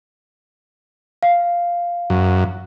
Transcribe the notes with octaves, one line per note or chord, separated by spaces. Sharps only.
F5
F#2